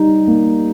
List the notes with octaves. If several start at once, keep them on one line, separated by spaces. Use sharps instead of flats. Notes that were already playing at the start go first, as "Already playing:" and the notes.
Already playing: G3 D#4
A#3